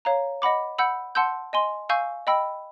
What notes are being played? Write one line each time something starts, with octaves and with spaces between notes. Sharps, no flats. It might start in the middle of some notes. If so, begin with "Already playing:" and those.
C#5 F5 A#5
D#5 F#5 B5 D6
F#5 B5 E6 G6
F#5 A5 C6 E6 G6
D#5 G#5 C6
F5 G#5 C#6 E6 G6
D#5 G5 B5 E6